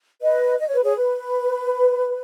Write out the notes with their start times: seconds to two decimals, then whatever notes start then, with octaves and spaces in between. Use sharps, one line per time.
0.22 B4 D#5
0.59 D#5
0.67 C#5
0.75 B4
0.84 G#4 C#5
0.96 B4